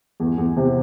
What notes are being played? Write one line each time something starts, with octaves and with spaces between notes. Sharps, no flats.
E2
E2
C3